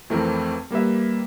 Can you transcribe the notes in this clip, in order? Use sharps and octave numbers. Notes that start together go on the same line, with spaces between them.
F2 E3 A3 C4 A#4
G3 A#3 B4 E5